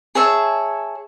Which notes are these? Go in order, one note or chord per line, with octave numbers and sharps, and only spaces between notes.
G#4 C#5 E5 A5